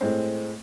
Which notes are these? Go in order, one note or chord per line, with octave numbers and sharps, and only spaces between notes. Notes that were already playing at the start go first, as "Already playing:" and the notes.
A2 G#3 C4